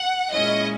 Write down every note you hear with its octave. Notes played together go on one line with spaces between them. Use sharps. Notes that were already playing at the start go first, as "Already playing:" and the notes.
Already playing: F#5
A#2 G#3 C#4 E4 D#5